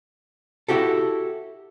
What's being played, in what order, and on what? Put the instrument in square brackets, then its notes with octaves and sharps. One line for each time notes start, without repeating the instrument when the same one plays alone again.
[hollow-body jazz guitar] E4 F#4 G4 A4